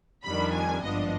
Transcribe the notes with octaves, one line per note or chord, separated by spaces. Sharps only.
F2 D#3 G3 D4 B5
G#5
G#1 G2 F3 B3 D4 D#5